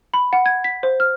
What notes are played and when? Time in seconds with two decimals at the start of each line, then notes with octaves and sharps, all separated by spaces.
0.14 B5
0.33 F#5
0.46 G#6
0.64 B6
0.83 C5
1.00 F6